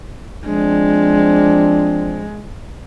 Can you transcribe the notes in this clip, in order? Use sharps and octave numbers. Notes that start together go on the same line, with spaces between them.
F3 G#3 C4 D4